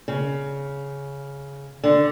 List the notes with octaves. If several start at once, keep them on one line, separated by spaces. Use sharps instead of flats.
C#3
D3